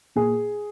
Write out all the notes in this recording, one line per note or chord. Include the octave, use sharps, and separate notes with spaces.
A#2 G#4